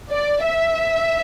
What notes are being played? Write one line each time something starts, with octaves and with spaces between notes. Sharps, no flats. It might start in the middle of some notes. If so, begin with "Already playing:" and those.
D5
E5